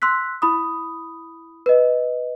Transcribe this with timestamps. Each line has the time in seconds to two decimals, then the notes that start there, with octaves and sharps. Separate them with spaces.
0.02 C6 E6 F#6 B6
0.42 E4 B5 D#6
1.66 B4 D#5